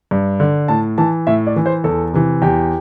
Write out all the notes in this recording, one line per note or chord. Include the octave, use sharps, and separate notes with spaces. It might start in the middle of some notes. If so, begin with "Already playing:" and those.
G2
D3
A2 A5
E3 A5
A2 E5
D5
E3
C5
E2 A4
C3 E3
E2 G4